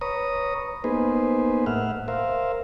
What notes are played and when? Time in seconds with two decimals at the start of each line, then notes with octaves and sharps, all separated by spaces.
0.01 B4 C#5 A#5 D#6
0.84 A#3 B3 D#4 G#4 B4 C5
1.66 A2 E5 F#5 F6
2.08 A#4 C5 E5 F5